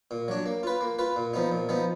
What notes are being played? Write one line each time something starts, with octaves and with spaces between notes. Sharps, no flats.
A#2
F#3 D4
A#3
F4 B4
A#3
F4 B4
A#2
F3 B3 D#4
A#2
F3 B3 D#4